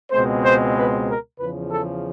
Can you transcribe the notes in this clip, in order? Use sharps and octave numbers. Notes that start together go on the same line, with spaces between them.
C#2 B2 G#3 C4 C5
C5
B4
A#4
E2 C#3 F3 B4
A4